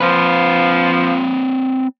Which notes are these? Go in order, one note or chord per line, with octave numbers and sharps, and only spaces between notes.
F3 C4 B4